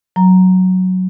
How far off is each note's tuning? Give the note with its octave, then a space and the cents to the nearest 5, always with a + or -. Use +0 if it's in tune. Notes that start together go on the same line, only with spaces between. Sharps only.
F#3 +0 A#5 +0